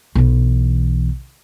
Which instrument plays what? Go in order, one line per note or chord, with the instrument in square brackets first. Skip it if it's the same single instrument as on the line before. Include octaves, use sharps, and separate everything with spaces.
[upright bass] B1 E3